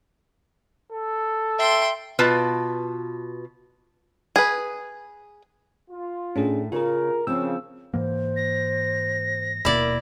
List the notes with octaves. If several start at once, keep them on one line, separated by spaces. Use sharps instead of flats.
A4
E5 G5 C6
B2 F4 B4 A5
G#4 B4
F4
A2 C#4 D4 G#4
C#3 F4 G#4 A#4
C#3 F3 C4 E6
G#2 E3 A#3 C5
A#6
D#1 B2 A#3 E4 A#4 D5